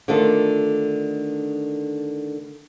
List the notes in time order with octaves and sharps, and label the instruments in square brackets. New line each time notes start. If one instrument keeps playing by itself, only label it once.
[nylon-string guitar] D3 D#3 A3 D4 F4 A4